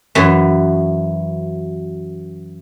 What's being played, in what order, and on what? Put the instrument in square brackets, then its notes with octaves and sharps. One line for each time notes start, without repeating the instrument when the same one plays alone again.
[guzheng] F#2 E3